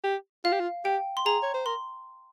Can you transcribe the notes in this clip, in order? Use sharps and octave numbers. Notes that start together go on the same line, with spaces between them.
G4
F4 F5
G4
F4
G4 G5
C6
G#4 A#5
C#5
C5
A#4 C6